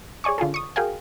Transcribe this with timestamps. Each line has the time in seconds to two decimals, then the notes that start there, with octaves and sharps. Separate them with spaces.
0.24 G#4 C#5 D5 G#5 C#6
0.38 D3 F4 G#4 A4
0.54 C#6 D#6
0.76 F#4 G#4 A#4 F5 G5 G#5